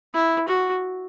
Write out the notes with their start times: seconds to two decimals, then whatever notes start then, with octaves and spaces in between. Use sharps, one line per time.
0.14 E4
0.48 F#4